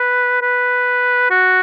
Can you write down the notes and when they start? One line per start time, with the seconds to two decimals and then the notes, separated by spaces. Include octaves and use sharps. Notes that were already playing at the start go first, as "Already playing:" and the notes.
Already playing: B4
0.42 B4
1.31 F#4